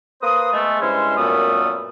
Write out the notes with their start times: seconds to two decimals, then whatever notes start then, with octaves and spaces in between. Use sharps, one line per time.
0.22 A#3 B4 C5 D#6
0.53 G#3 A3 B3
0.81 G2 G#3 C#4 E4 C5
1.17 F#2 A#2 G3 A3 B3 D#6